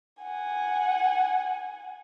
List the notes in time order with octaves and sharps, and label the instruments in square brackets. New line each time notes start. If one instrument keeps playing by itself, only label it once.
[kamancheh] F#5 G#5